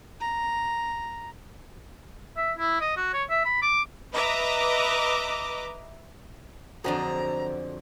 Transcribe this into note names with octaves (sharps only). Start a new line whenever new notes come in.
A#5
E5
E4
D#5
F#4
C#5
E5
B5
D6
B4 D#5 E5 A#5 D6
F2 D3 F#3 G#4 C5 D5 A#5